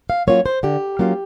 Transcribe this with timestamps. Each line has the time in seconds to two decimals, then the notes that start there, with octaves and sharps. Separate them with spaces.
0.10 F5
0.27 F#3 A#3 C#4 F4 C#5
0.46 C5
0.63 D3 G4
0.99 F#3 A#3 C#4 F4